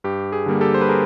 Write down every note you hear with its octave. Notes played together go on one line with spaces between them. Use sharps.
G2 G4
G#4
D3 G3 A#3
G4 A4
C5
B4
G#4 A#4